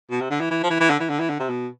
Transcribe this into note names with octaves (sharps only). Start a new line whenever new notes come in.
B2
C3
D3
E3
E3
F3
E3
E3
D3
E3
D3
E3
D3
C3
B2